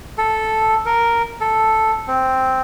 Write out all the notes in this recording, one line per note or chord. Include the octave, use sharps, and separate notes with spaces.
A4
A#4
A4
C4